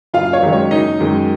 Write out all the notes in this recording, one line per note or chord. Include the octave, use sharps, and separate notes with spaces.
F#1 F4 F5
C#5
F#2 D#3 G#3
C#5
F#1 D#4 D#5
F#2 D#3 G#3